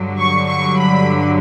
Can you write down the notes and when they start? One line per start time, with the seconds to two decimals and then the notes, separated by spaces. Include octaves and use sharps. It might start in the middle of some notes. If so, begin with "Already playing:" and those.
Already playing: G2 D3 F#3
0.18 C#6
0.48 C#6
0.78 B5